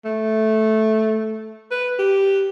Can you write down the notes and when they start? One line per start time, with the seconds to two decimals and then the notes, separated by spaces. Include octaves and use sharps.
0.05 A3
1.71 B4
1.99 G4